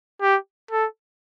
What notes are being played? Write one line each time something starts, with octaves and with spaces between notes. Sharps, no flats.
G4
A4